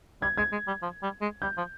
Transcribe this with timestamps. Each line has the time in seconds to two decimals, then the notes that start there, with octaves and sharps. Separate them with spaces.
0.22 G3 G#6
0.37 G#3 G#6
0.52 G#3
0.67 G3
0.82 F3
1.03 G3
1.21 G#3
1.42 G3 G6
1.57 F3